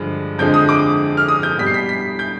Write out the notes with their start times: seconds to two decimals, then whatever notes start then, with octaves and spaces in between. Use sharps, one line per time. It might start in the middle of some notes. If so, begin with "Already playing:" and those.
Already playing: G2 D3 F3 G#3
0.38 F2 D3 F3 G#3 G6
0.54 D#6
0.69 D6
1.17 F6
1.28 D#6
1.43 G6
1.59 B2 G3 B6
1.67 C7
1.74 B6
1.89 B6
2.19 G6